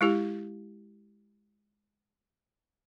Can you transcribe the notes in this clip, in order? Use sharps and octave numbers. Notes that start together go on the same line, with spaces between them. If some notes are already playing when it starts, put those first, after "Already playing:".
G#3 E4 G4